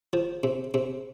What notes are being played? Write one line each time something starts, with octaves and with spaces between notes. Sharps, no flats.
F3
C3
C3